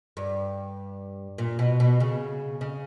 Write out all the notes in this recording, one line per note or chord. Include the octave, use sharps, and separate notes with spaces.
G2
A#2
B2
B2
C#3
C#3